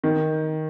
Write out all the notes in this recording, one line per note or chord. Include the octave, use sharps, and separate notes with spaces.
D#3